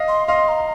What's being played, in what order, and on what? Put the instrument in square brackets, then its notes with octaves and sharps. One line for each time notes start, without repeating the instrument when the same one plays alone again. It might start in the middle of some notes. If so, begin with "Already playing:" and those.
Already playing: [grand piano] D#5 F5
[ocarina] C6
[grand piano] D#5 F5 [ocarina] C6
[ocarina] A#5